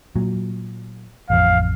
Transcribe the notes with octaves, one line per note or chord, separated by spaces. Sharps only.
A#2 F#3
A1 F2 F5